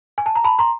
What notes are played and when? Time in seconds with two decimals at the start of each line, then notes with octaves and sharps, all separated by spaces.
0.18 G#5
0.26 A5
0.35 A#5
0.44 A5 B5
0.59 A#5 C6